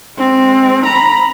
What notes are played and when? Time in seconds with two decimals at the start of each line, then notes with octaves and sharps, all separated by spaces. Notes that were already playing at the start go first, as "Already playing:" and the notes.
0.17 G#3 C4
0.84 A#5 B5